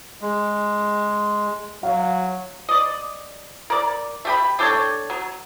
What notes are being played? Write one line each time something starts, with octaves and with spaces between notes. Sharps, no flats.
G#3
F#3 F5
D5 D#5
A#4 D5
A3 G4 B5
D4 G4 A4 C#5
F#3